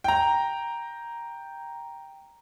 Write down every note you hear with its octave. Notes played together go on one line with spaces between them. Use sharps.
G5 A#5